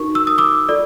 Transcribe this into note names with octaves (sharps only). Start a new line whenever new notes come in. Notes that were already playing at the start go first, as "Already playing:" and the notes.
Already playing: D#4 F#4 A#4 C#6
E6
D#6
D6 E6
F4 A4 D5